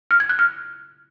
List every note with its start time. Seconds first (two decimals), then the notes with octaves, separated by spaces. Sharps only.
0.11 F6
0.20 G#6
0.29 F#6
0.39 F6